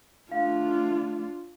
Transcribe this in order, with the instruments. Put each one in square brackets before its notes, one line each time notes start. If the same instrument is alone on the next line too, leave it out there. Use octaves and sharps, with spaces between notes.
[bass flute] A3 [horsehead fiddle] D4 F4 [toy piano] F5